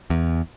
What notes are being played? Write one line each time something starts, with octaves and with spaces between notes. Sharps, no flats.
E2